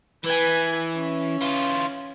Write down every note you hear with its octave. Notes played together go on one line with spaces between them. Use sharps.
E3 B4 G#5
C#4
E3 F4